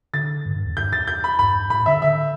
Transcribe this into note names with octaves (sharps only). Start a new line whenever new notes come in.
D3 A6
G2
G2
E2
G2 G6
E2 A6
G6
B5
G2 B5
A2 B5
D3 E5
D3 E5